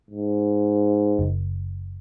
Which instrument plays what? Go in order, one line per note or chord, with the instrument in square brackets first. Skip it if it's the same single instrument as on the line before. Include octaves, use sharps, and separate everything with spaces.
[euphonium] G#2
[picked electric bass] F#1